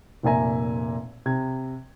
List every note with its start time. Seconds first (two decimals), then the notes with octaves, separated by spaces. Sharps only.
0.23 F1 A#2 A#3 E5 G#5 A#5
1.26 C3 G#6